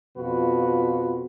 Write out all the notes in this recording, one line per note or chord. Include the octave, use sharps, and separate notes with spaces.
F2 B2 F4 F#4 B4